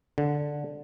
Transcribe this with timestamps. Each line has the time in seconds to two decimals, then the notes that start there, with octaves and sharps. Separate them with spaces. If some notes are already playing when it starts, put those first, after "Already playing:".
0.18 D3